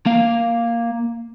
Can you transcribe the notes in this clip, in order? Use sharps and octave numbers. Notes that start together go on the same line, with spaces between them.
A#3 F5